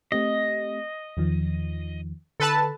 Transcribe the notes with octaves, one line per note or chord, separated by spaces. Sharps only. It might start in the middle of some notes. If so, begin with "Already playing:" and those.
A3 C4 G4 D#5
E2 D#3 F3
D3 A4 B4 A5